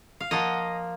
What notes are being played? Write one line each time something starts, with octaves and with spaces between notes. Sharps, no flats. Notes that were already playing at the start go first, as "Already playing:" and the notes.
F5
F3 A#3 F4 D#5 F#5